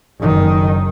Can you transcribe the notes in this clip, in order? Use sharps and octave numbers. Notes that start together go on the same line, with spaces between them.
F#1 D#3